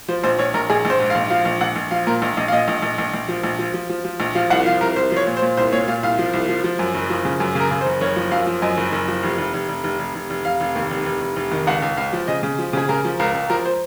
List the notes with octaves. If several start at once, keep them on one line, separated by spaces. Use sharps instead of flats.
F3 C5
A#1 C5
A#1 C#5
A#1 A#4
A#1 G#4
A#1
C5
G#2
F5
A#1
F3 F5
A#1
A#1 F#5
A#1
F3 F5
A#2 A#4
A#1
A#1 D#5
F5
A#2 D#5
A#1
A#1
A#1
A#1
F3
A#1
F3
F3
F3
F3
A#1
F3 F5
C2 F#5
F3 F5
C2 A#4
C2 C5
F3 C#5
A#2
C5
A#2
C2 C5
A#2 C#5
A#2 F5
C2 F5
F3
C2
F3
F3
F#2
F#1
F3
C#3
F#2
C#3
A#4
C#3
C5
F#1
F#1 C#5
F3
F#2 F5
F3
F#2 D#5
F#1
F#1
F3
F1
F1
F1
F1
F1
F1
F1
F1
F1 F5
F1
D#2
F1
F1
F1
F1
D#3
C#2 F#5
C#2
C#2 F5
F3
C#3 D#5
C#3
F3
C#3 G#4
C#3 A#4
F3
C#2 A#4
C#2
F3 A#4
C5